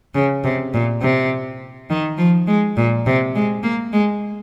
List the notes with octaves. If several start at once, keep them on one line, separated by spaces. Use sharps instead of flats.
C#3
C3
A#2
C3
D#3
F3
G#3
A#2
C3
G#3
A#3
G#3